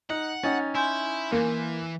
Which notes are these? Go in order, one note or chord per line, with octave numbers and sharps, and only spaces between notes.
D#4 F#5
C#4 D#4 G5 A6
E4 G#5 C6 G6
E3 A#3